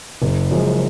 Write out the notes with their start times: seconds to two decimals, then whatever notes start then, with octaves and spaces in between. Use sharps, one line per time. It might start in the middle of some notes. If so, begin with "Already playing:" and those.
0.22 F#1
0.51 F#2 F3 G#3